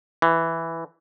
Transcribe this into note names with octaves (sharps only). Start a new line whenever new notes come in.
E3